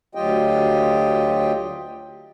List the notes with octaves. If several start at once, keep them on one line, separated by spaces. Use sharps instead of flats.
D2 F#3 F4 G4 D#5 G5